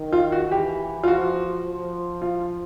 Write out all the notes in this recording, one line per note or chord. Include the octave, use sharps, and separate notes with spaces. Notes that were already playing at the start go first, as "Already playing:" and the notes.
Already playing: D#3
F4
F#4
E3 G4
F4
F3 F#4
F3
F4